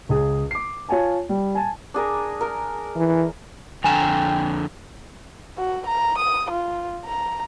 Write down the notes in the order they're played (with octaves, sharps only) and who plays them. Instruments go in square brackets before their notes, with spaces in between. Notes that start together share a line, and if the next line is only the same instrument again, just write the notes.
[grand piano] C#2 G#4
D6 C7
F4 C#5 G#5 A5
G3
G#5 A5
[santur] D4 G#4 A#4
A#4
[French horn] E3
[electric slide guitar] F2 D3 A#5 [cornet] G5 [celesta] G#5 E7
[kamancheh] F#4
A#5
D#6
F4
A#5